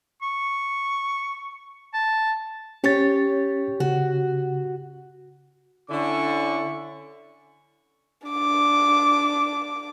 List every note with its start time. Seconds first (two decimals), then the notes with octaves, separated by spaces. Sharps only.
0.22 C#6
1.94 A5
2.84 C#4 G4 C#5 A6
3.80 C#3 F#4
5.90 D3 C#4 E4 D5 C#6
8.28 D4 D6